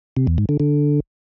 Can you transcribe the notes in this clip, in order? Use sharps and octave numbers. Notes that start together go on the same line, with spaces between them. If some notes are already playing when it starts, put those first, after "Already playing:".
C3
E2
G#2
D3
D3